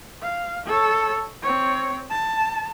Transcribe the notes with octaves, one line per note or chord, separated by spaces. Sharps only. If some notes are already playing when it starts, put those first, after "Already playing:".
F5
A4 C#5
C4 C#5
A5